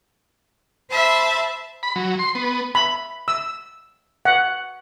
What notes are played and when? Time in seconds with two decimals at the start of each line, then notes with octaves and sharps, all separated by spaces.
0.90 C5 E5 A5 B5
1.83 B5
1.96 F#3
2.19 C6
2.35 B3
2.75 B5
3.28 E6
4.25 F#5